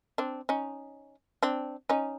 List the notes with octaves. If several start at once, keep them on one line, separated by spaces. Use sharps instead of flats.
C4 D4
C#4 D#4
C4 D4
C#4 D#4